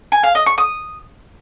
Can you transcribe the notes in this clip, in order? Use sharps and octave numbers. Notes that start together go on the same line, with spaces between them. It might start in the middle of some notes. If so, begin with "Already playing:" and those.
G#5
F5
D#5
C#6
D#6